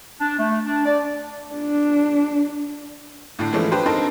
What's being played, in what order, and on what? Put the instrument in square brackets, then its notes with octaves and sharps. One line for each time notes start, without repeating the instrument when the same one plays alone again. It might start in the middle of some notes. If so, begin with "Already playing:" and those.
[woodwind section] D4
A3
D4
D5
[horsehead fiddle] D4
[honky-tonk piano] A2 D3 D4
E3 F3 G#3 A3 C#4 E4
D4 G4 B4 C5
C4 D4 D#4 A4 A#4 C5